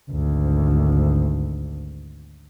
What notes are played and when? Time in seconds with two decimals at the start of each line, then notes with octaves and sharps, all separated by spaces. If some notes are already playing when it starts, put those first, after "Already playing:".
0.11 G#1 D2